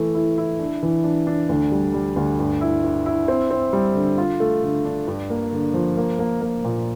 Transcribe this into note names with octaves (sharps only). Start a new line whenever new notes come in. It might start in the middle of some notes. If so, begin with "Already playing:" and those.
Already playing: E3 A3
E4
E4
D4
E3
D4
D4
D2
G3
G3
D2
G2
E4
G2
E4
C4
C4
G3
D3
F4
A3
D3
D4
G2
A#3
D3
F3
A#3
A#3
A#3
A#2